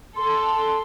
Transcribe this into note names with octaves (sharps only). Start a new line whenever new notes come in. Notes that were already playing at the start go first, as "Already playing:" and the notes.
A4 C6
C6